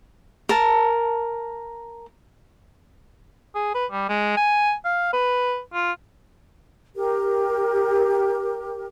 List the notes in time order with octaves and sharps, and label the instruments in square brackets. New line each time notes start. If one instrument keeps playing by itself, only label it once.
[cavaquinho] A#4 A5
[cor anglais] G#4
B4
G3
G#3
G#5
F5
B4
F4
[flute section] G4 A#4